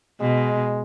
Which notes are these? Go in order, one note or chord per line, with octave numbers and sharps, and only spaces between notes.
B2 G#3